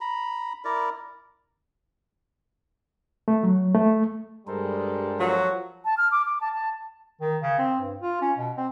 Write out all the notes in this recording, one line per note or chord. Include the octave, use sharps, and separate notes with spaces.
A#5 B5
E4 A#4 D5 A#5
A3
F#3
A3
G2 G3 G#3 A4 A#4 C5
F3 F#3 F#4
A5
F6
D6
D6
A5
A5
D#3
C#3
C4
G2
F4
C#4
B2
C4